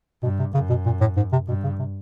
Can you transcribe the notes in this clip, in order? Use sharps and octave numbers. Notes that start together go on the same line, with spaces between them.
G2 B2
C3
F#2 C#3
B2
A#2
A2
G#2
C3
G2 B2
C#3
C3